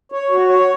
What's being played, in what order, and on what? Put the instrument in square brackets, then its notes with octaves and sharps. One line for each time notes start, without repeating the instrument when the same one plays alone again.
[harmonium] C#5
F#4
C#5